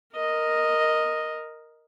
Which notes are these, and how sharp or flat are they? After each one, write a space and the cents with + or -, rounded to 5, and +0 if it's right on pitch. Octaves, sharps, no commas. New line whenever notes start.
A#4 +0 D#5 +0